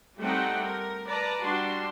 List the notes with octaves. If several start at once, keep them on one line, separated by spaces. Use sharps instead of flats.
G3 A3 C4 D#4 F#5 G5
A#4
B4 D5 A5 A#5
G3 D4 F#4 C6